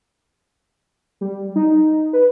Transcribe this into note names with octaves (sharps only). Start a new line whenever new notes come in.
G3
D#4
B4